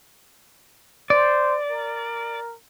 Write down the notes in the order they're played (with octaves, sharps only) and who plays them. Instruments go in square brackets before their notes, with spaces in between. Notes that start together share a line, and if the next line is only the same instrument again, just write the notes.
[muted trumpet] C5 [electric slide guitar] D5
[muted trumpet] A#4